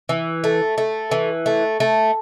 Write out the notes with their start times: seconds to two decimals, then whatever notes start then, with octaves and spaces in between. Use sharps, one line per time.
0.09 E3
0.44 A3
0.78 A3
1.11 E3
1.46 A3
1.80 A3